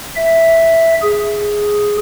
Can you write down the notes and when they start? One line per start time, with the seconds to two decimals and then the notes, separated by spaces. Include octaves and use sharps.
0.16 E5
1.02 G#4